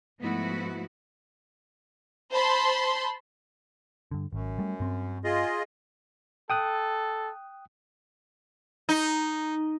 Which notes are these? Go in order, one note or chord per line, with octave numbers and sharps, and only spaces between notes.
G#2 F3 A3 B3 E4 F#4
C5 A5 B5 C6
G2 D3
G#1 F#2
G3 A3
G2 C4
F4 G#4 D#5
A4 G5 D#6 F#6
D#4